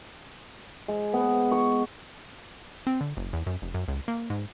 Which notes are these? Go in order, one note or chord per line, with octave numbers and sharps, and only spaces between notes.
G#3
B3
C#6
C4
D3
F#1
E2
F#2
F1
F#2
C#2
A#3
G#2